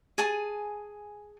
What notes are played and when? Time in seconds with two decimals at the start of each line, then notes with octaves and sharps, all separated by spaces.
0.18 G#4 G#5 A5